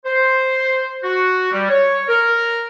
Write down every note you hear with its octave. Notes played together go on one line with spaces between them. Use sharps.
C5
F#4
G3
C#5
A#4